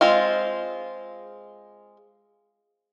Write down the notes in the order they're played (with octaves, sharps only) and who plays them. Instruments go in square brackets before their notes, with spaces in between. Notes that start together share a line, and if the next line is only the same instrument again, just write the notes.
[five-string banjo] G#3 C4 F4